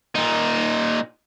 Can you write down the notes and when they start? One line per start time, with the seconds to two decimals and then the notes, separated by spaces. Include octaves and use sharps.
0.15 A#2 D#4